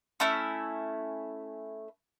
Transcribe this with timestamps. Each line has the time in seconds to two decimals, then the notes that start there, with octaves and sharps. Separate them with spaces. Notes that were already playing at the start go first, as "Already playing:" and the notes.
0.20 A3 C#4 E4